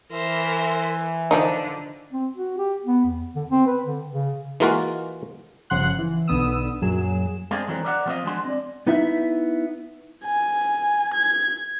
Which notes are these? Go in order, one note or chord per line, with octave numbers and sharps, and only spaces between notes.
E3 A#4 C5 E5
D3 F3 D4 D#4
C4
F#4
G4
B3
E2
D3
C4
B4
D3
C#3
E3 G#3 A#3 F4 F#4
G1 C#3 F3 F#5 C6 F#6
E3
B1 D3 B3 D#6 E6
F#2 A#2 F#3 G#4 E7
G#3 A#3 C4 D4 G#4
D3 E3 F#3 G#3 C4 D#4
A#4 D5 E5 F#5
F3 G3 A#3 C4 F4 D#5
F3 G#3 D4 F#4 G#4 C6
C4 D5
B3 D#4 E4 E5
G#5
G#6